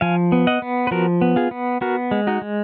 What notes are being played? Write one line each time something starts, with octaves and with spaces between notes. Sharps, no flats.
F3 F5 G#5
B3
D#5 F#5
B3
B4
F3 F#4 A#4
B3
F4 G#4
B3
B3 F#4 A#4
G#3
D#4 F#4
G#3